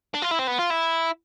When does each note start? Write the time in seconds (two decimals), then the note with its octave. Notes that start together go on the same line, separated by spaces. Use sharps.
0.14 D4
0.22 F4
0.31 E4
0.39 C4
0.47 B3
0.58 F4
0.70 E4